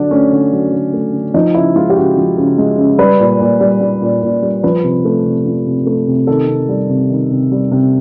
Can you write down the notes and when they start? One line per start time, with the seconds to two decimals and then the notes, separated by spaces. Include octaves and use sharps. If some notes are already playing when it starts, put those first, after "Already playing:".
Already playing: D3 F#3 D4
0.11 A3 C#4
0.32 D3
0.52 F#3
0.72 D3
0.93 A3
1.13 D3
1.34 F3 D#4
1.55 C#3 E4
1.76 G#3 F4
1.90 G4
1.96 C#3 F#4
2.17 F3
2.37 C#3
2.58 G#3
2.78 C#3
2.98 G3 B4
3.20 A#2
3.40 A#2
3.60 G3
3.81 G3
4.02 A#2
4.23 A#2
4.42 G3
4.64 F3 B4
4.84 C3
5.05 A3
5.25 C3
5.45 F3
5.66 C3
5.86 A3
6.07 C3
6.27 D#3 A4
6.48 C3
6.69 G3
6.89 C3
7.10 D#3
7.31 C3
7.52 G3
7.71 C3